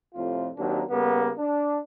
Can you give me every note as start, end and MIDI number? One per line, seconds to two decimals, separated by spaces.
0.15 0.49 41
0.15 0.49 45
0.15 0.49 48
0.15 0.49 60
0.15 0.49 65
0.57 0.83 39
0.57 0.83 54
0.57 0.83 58
0.57 0.83 60
0.57 0.83 62
0.89 1.32 49
0.89 1.32 55
0.89 1.32 58
0.89 1.32 59
1.38 1.79 62